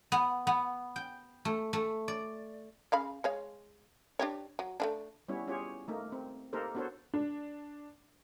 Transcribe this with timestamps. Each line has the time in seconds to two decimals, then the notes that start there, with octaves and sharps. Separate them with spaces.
0.12 B3
0.47 B3
0.96 G5
1.45 A3
1.73 A3
2.08 D5
2.92 C#3 F5 B5
3.24 G#3 C#5 F5
4.19 D4 G4 C#5
4.59 F#3
4.80 A3 A#3 D4
5.28 G3 B3 C#4 E4 C#5
5.48 C#4 F4 G4 G#4 C#5
5.88 A3 A#3 D#4
6.12 C4
6.53 A#3 D#4 G4 A4 A#4 C5
6.75 B3 D4 F#4 A4 C5 C#5
7.14 D4